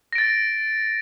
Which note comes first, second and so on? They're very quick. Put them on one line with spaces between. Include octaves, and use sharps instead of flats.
A#6 D7 A6